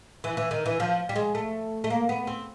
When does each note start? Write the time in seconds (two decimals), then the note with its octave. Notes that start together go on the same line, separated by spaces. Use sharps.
0.24 E3
0.37 E3
0.51 D#3
0.66 E3
0.80 F3
1.09 G3
1.16 G#3
1.35 A3
1.84 A3
1.90 A#3
2.09 B3
2.27 C4